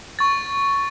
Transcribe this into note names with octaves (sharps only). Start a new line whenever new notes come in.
C#6 A6